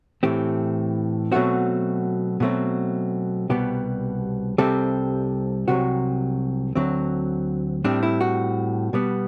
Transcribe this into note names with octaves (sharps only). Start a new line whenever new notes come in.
A2 E3 A3 C4 G4
B2 F#3 A3 C4 F#4
B2 F#3 A3 C4
C2 B2 G3 B3 G4
C2 C3 G3 C4 A4
C2 C3 F#3 F#4
D2 D3 F#3 C4
A2 G3 C4 D4
E4
F#4
B2 G3 B3